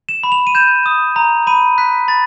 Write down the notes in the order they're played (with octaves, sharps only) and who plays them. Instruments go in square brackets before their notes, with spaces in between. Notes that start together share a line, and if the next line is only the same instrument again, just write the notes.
[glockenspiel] E7
B5
F7
D#7
G6 E7
D#6
A#5
B5 D#7
F#6 B6
B5 A6